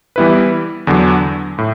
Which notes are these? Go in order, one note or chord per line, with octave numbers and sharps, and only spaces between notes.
E3 G3 B3 E4 B4
E2 D3 F#3
A2